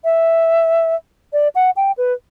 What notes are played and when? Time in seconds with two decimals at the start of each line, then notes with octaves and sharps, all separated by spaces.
0.04 E5
1.33 D5
1.55 F#5
1.76 G5
1.98 B4